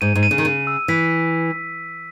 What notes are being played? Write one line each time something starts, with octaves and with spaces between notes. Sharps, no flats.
G#2 D#7
G#2
D#7
C#3
D#3
C#3 D#7
E6
E3 B6